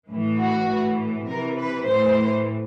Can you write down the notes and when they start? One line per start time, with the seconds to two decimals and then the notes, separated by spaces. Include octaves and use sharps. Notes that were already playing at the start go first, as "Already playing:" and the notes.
0.09 A2 E3
0.38 F#4
0.69 A2 E3
1.27 C3 E3 A#4
1.57 B4
1.86 A2 E3 C5